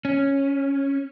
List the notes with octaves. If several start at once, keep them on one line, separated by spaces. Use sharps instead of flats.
C#4